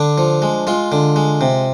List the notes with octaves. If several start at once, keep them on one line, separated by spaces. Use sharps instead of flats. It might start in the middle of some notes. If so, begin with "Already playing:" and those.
Already playing: D3 D4
F3
G#3
G#3 F4
D3
G#3
C3